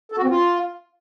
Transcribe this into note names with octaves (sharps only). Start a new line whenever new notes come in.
A4
F#4
C4
F4